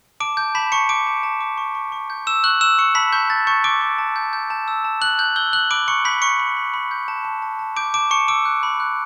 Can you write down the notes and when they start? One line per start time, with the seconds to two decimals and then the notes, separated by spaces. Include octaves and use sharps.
0.20 A5 D6 D7
0.37 A5 G6
0.55 A5 B5 B6
0.72 A5 C#6 C#7
0.89 D6 G6 D7
1.07 A5
1.23 A5
1.41 D6
1.58 C#6
1.75 C#6
1.92 C#6
2.10 G6
2.27 C#6 E6 E7
2.44 C#6 F#6 F#7
2.61 C#6 E6 E7
2.78 C#6 C#7
2.95 A5 B5 B6
3.13 C#6 G6
3.30 A5 A6
3.47 C#6 G6 C#7
3.64 C#6 D6 D7
3.81 C#6
3.98 A5
4.16 G6
4.33 G6
4.50 A5
4.68 E6
4.84 A5
5.02 A5 F#6 F#7
5.19 F#6 G6 F#7
5.36 E6 G6 G7
5.53 F#6 G6 F#7
5.70 B5 D6 D7
5.88 B5 C#6 C#7
6.05 B5 G6 B6
6.22 B5 C#6 C#7
6.40 B5
6.56 B5
6.74 B5
6.91 G6
7.08 A5
7.25 A5
7.42 A5
7.59 A5
7.77 D6 G6 D7
7.94 A5 D6 D7
8.11 A5 C#6 C#7
8.28 D6 E6 D7
8.45 F#6
8.63 B5
8.80 F#6